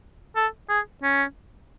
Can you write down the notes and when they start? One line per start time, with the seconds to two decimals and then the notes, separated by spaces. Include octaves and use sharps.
0.36 A4
0.69 G#4
1.03 C#4